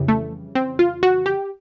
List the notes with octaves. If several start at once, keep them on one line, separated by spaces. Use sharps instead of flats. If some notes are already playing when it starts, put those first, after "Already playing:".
Already playing: F2 C#3 E3 G3
A3
C4
F4
F#4
G4